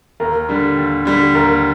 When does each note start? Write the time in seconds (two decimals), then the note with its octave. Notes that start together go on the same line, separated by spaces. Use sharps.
0.20 D#2 A#4
0.49 D3 G3
0.77 D#2
1.05 D3 G3
1.35 D#2 A#4